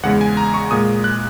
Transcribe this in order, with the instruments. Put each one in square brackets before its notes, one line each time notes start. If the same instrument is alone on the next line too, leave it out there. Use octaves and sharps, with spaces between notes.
[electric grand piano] E2 C#3 G#3 F#5
G#5
A#5
C#6
A#2 G#3 D#6
F#6